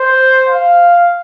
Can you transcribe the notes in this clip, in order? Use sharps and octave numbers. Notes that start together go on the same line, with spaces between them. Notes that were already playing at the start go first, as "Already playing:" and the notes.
Already playing: C5
F5